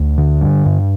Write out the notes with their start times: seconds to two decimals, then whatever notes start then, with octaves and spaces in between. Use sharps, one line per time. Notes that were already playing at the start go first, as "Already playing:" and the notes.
Already playing: D2
0.18 D3
0.41 G2
0.66 G2